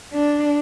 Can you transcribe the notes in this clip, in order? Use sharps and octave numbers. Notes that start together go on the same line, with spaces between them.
D4